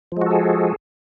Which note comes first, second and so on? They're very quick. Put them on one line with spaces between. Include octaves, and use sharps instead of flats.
F3 G#3 F#4 A4 G#4